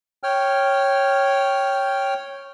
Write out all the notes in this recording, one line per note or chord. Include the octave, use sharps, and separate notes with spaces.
C#5 G5 F6